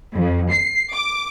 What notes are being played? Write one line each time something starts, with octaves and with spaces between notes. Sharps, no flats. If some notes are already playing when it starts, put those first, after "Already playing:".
F2
C7
D6